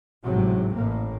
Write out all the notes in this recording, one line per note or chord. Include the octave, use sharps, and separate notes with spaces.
G#1 A2 C3 F#3
A1 A2 A#3